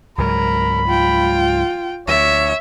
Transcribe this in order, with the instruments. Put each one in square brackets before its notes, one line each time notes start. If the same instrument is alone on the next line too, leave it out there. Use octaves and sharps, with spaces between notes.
[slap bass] C#2 G#2 F#3 [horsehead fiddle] A#4 [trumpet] B5
[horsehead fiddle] F4 G5
[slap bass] D2 [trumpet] C#5 [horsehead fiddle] E5